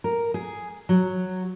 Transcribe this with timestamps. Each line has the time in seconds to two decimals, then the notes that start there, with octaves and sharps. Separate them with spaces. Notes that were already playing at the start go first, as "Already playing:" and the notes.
0.04 A#4
0.34 G#4
0.89 F#3